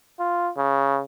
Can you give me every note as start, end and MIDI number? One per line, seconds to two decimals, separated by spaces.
0.20 0.50 65
0.57 1.01 49